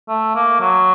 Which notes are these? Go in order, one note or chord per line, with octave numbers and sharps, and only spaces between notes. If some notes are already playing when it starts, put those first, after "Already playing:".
A3
A#3
F#3